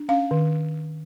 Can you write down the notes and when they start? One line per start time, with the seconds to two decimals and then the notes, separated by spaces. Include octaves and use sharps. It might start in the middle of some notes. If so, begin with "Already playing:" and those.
Already playing: D4
0.09 C#4 F5
0.31 D#3